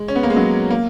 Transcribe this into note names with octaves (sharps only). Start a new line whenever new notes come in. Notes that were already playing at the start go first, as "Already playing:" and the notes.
Already playing: G#3
C#4
B3
A#3
G#3
F#3
A#3